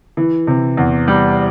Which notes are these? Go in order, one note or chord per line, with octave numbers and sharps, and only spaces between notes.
E3
C3
E2
G3